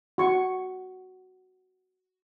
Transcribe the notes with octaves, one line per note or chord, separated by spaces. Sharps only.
F#4 C#6